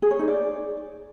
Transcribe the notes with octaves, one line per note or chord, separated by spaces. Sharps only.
G#4
C#5
D#4
D5